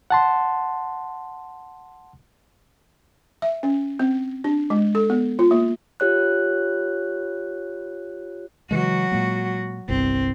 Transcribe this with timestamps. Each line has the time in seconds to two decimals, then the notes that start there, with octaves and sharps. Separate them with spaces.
0.10 F#5 A5 C6
3.42 E5
3.63 C#4
3.99 C4
4.44 D4
4.70 G#3
4.95 A4
5.10 B3
5.39 F4
5.51 A#3
6.00 F4 G4 C#5 F#6
8.71 C#3 E3 F#3 G#3 F#4
9.12 A#2 G#3 A#3
9.89 G1 C2 G2 C4